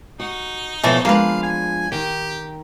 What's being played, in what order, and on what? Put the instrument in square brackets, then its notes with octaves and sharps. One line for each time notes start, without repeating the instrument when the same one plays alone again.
[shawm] D#4 [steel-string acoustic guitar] F#4
[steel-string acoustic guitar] B2 F3 C#5 [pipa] E3 A3 C4
[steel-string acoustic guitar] F3 G#3 D4 [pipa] A#3 B4 [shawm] F5
[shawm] G#5
[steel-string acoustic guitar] D#3 [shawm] G4